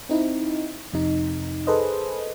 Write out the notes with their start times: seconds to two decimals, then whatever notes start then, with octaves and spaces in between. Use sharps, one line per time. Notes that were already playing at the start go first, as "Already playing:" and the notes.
0.09 C4 D#4 E4
0.93 F2 C3 D#4
1.67 G#4 A4 B4 C5 D#5